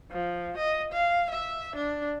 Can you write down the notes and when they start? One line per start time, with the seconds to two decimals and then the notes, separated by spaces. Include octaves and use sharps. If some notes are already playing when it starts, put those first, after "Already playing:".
0.11 F3
0.57 D#5
0.92 F5
1.31 E5
1.76 D4